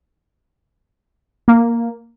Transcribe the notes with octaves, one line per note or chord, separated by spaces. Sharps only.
A#3